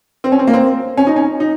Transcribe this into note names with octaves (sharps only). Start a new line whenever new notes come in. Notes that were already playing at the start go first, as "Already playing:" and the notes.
C4
C#4
C4
A#3
C4
C#4
D#4
C#4
D#4